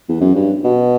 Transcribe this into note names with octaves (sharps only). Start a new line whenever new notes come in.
E2
F#2
G2
B2